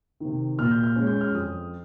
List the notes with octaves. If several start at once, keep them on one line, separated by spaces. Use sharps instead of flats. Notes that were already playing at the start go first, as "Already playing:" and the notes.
C3 D#3
A#2 F6
G6
F6
G#3 C#4
G6
F6
F2 D#6